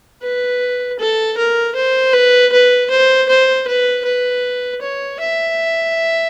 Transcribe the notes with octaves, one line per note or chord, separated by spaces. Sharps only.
B4
A4
A#4
C5
B4
B4
C5
C5
B4
B4
C#5
E5